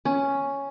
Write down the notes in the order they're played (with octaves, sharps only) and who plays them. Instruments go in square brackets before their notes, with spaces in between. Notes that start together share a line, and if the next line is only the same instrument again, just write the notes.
[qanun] C#4